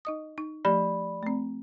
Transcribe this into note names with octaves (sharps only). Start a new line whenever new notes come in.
D#4 D#5 D#6
D#4
F3 A3 G4 D5 B5
A3 C4